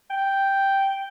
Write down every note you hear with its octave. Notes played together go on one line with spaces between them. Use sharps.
G5